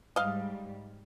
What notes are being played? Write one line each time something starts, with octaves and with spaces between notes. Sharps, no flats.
G#2 G3 D#5 F5